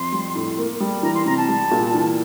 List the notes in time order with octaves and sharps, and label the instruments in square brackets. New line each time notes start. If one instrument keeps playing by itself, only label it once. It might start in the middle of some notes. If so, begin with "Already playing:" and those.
Already playing: [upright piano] F2 [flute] C6
[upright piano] G3
A2
A#3
G3
[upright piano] E3 [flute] A#5
[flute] C6
[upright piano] C3 [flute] A#5
[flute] A5
[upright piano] G3
A#2
E3